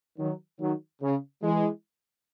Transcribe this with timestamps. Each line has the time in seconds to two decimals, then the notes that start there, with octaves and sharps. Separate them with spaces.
0.19 D#3 F#3
0.60 D#3 F#3
1.02 C#3
1.43 E3 G#3